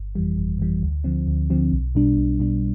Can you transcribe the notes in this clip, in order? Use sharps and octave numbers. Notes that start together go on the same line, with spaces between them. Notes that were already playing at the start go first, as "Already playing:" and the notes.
Already playing: G1
F2 E3 G3
G1
F2 E3 G3
D2
D3 F3 C4
D2
D3 F3 C4
B1
B2 G3 D4
B1
B2 G3 D4